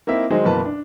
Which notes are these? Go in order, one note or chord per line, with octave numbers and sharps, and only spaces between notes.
A#3 C4 D#4 E4 E5
D#3 F#3 G#3 C5 D#5
F#1 B2 E3 A#3 B4 A5
D4